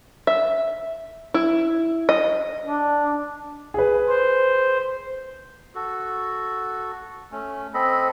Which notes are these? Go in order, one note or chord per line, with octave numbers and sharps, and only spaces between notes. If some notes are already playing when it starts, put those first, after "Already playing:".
E5
E4
D#5
D4
G#4 B4
C5
F#4 A4
A3 C#4
C4 A4 D#5 B5